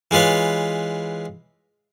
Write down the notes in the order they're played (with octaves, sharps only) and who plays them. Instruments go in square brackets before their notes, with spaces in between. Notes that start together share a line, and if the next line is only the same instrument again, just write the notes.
[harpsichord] E3 G#3 F4 B4 C#5